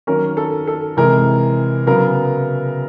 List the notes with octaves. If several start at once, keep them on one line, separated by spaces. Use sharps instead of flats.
D#3 F#3 A#3 C#4 A#4
A4
A4
C3 E3 G#3 A#4
C#3 F#3 B3 A#4